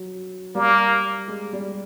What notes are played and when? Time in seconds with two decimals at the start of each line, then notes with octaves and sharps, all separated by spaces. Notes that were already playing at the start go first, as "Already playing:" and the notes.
Already playing: F#3
0.55 G3 A#3
1.28 G#3
1.53 G3